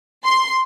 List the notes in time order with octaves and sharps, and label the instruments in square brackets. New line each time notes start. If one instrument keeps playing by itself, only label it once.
[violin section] C6